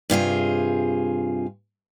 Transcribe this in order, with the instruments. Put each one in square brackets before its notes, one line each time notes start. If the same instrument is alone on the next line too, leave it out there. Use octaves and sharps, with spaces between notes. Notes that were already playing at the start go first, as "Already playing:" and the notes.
[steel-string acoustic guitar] G2 C3 F4 G#4